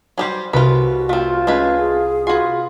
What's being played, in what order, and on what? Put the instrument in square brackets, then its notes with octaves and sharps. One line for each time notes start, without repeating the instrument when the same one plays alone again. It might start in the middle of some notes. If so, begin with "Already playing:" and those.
[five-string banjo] F#3 G3 G4 [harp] C5 G#5
[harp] C2 [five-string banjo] F4 B4 [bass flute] F#4
[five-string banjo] A3 C4 [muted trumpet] F4
[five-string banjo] G#3 A3 B4 [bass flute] C#4
[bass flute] G#4
[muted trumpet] F4 [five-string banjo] F#4 G#5 [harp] B4 C6